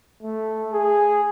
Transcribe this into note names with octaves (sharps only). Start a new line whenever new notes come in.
A3
G#4